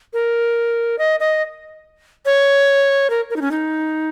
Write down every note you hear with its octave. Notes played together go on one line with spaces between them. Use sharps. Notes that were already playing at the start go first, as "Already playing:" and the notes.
A#4
D#5
D#5
C#5
A#4
A#4
D#4
C#4
D#4